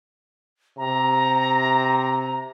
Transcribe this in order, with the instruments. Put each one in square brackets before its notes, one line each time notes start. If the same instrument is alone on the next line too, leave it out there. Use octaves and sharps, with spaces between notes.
[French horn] C3 [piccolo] A#5